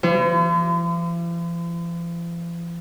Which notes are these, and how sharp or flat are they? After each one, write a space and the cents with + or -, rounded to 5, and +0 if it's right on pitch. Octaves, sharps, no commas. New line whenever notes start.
F3 -45 E4 +45